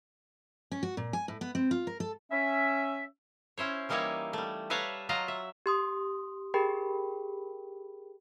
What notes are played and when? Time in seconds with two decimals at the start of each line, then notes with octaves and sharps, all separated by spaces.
0.72 C#4
0.83 F#4
0.97 A#2
1.13 G#5
1.28 A2
1.41 B3
1.55 C4
1.71 F4
1.87 A#4
2.00 A4
2.31 C#4 E5
3.58 C#4 E4 C5 C#5
3.89 E3 G3 A#3 D#4 E4 C#5
4.33 G3 A3
4.70 B4 C#5 E5 F5 A5 A#5
5.09 F#3 F4 D#5 F5 A#5
5.28 E5
5.66 G4 C6 D#6
6.54 G4 G#4 A#4 G5 B5